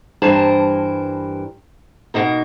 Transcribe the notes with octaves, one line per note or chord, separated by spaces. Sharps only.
G2 E3 A#4 C5 A5
B2 A#3 D#4 A#4